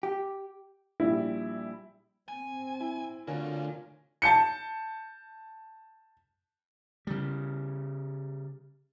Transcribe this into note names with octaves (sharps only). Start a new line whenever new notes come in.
G4
A#1 G3 E4
C4 G#5
E4
D3 A3 F4 F#4 A#4 C#5 G#5
A5 G6 C#7
C#3 G3